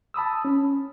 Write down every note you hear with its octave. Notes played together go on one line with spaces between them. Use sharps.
A5 B5 D#6 E6
C#4